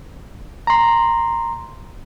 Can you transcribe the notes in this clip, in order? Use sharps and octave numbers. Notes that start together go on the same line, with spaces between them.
A#5 C6